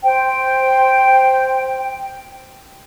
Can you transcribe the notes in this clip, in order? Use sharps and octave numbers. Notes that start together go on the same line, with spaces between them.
C5 G5